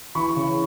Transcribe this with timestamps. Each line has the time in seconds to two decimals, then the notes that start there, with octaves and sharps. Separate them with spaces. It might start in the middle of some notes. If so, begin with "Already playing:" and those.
0.15 E3 B5 C#6
0.36 C#3